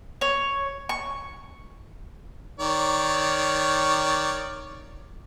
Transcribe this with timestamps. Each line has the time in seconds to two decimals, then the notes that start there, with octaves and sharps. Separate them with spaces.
0.21 C#5
0.89 C#6
2.59 D#3 C#5 D5